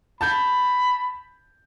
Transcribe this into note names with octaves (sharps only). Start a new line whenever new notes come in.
A5 B5 G6